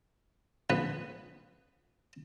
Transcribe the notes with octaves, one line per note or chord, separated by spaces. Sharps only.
A#1 B3 B4